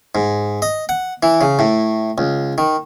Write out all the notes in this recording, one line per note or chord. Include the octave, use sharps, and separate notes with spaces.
G#2
D#5
F#5
E3
C#3
A2
C#2
D#3